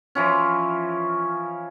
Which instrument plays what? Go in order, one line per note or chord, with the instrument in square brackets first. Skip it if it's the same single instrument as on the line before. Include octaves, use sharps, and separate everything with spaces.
[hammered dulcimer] E3 F3 C#4